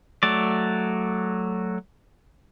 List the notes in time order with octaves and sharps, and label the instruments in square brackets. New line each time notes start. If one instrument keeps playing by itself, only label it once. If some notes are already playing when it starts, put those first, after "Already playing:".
[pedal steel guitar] F#3 A3 D5